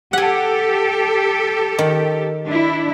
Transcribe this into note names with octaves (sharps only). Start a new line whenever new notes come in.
G4 A4 F#5 G#5
D#3
D4 E4